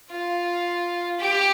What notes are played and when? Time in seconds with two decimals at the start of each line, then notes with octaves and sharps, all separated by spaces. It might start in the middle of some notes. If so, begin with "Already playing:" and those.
0.11 F4
1.20 G4